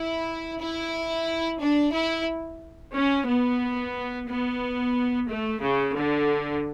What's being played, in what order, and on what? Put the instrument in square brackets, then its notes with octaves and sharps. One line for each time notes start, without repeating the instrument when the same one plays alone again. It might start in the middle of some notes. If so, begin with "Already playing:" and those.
Already playing: [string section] E4
E4
D4
E4
C#4
B3
B3
A3
C#3
D3